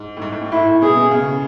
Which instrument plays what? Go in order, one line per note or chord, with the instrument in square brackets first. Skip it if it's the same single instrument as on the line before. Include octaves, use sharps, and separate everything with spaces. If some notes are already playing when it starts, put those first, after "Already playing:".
Already playing: [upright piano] G#2
A2
G#2
G#2
A2
[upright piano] A2 [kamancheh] E4
[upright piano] A2
[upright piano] B2 [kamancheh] G#4
[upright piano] B2
C#3